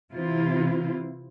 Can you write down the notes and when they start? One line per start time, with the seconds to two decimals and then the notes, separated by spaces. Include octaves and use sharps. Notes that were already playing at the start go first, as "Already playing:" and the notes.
0.12 C3 E3 C4 E4 F4